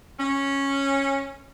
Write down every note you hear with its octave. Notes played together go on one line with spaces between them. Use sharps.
C#4